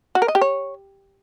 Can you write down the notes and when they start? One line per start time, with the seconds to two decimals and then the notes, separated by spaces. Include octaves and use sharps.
0.15 F#4
0.22 A#4
0.28 D#5
0.35 G4
0.41 C#5